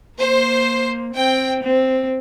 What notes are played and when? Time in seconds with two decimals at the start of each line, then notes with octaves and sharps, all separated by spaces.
0.19 A#3 C5
1.14 C4 G5
1.63 C4